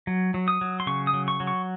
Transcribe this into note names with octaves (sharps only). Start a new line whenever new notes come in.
F#3
F#3
D#6
F#3
C6
C#3 C#6
D#6
F#3
C#6
F#3
C#6